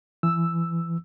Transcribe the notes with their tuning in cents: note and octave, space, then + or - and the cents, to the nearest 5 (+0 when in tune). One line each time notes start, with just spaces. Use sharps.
E3 +25 E6 +0